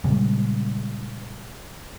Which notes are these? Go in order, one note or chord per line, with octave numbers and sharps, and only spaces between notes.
A#2 C#3 G3 G#3